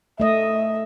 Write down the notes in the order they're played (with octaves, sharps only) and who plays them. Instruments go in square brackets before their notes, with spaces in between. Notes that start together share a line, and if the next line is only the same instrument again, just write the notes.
[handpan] A3 D#5 [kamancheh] E5